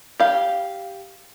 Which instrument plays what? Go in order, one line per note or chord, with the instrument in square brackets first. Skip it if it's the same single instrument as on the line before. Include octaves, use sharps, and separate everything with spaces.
[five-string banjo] G4 F5